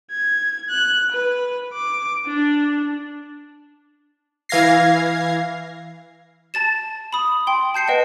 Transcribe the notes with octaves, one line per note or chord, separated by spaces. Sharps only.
G#6
F#6
B4
D6
D4
E3 F5 G#6 A#6 C7
A5 A6 E7
B5 D#6
G5 C6
A5 G6 C7 C#7
B4 D#5 F#5 G5 A5